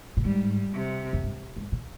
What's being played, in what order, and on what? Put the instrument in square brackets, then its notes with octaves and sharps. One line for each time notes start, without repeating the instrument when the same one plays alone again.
[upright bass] A#2
[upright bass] G#2 [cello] G3
[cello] C3
[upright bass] F2
G2
G#2
A#2